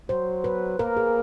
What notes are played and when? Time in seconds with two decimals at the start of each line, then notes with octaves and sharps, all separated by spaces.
0.09 F#3 C5
0.44 B4
0.79 A#3 A#4
0.97 G#4